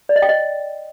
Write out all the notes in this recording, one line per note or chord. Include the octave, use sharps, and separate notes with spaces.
D5
D#5
G5
D#5